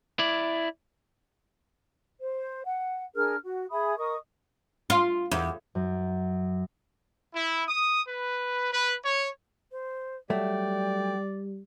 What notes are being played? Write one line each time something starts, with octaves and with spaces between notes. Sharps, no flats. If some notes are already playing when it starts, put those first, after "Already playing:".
E4 D5
C5
F#5
D4 G#4 A#4 F6
F#4
G#4 E5 B5 D#6
A#4 D#5 C#6 D#6
F4
E2
F#2
E4
D#6
B4
B4
C#5
C5
F#3 G3 A3 D5 G5